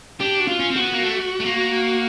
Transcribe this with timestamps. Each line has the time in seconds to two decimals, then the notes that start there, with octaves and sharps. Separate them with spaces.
0.20 D4 G4
0.40 F#4
0.47 F4
0.59 C#4
0.71 C4
0.76 F#4
0.81 B3
0.93 A#3
1.04 A3
1.40 A3
1.46 A#3